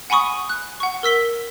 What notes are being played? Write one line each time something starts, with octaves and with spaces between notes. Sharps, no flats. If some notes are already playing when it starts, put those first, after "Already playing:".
F#5 G#5 B5 C#6 D#6
F#6
F#5 C#6
A#4 E6 B6 G7